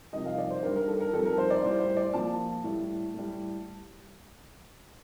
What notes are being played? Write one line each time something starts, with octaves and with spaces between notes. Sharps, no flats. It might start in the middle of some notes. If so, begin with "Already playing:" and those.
F2 C3 D#3 G3 D#5
F5
D5
C5
G2 D#3 G3 A#4
A#4
A4
A#4
F2 D#3 G3 A4
A#4
C5
D5
A2 G3 C5
C5
D5
A#2 F3 A5
A2 G3
A2 G3